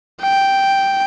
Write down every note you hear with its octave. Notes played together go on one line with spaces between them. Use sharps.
G5